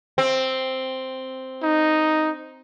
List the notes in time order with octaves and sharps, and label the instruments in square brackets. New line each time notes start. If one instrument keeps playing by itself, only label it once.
[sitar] C4
[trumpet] D#4